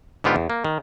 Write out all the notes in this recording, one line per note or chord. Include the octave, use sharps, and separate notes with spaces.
G#2 D3 B3 F4 G4
E2
A#3
D#3